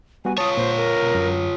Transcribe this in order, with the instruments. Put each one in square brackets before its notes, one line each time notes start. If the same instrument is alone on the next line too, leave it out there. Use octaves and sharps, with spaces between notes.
[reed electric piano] G3 B3 F#4 [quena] G#5
[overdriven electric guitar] F4 C#5 [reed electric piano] A5 [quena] D#6
[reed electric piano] A#2 [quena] C5
[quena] A#4
[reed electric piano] B2
F#2